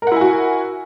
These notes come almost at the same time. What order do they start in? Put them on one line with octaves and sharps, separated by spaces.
A#4 F#5 E4 G#5 F#4